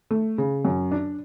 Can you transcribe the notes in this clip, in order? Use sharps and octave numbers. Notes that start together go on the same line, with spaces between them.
A3
C#3
F#2
D4